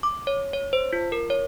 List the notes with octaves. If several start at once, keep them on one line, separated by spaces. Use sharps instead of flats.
D6
C#5
C#5
C5
F4
A#4
C#5